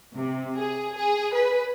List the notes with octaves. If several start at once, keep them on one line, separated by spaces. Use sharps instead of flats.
C3
G#4
G#4
B4